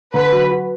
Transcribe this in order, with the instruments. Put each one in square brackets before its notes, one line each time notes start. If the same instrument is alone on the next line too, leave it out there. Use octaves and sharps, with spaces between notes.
[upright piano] D3 [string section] B4
[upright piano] F#3
F#4